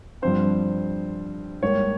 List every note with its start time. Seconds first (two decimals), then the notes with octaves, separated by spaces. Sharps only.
0.22 G2 F3 C4 C5
1.62 G#2 G3 A#3 C#5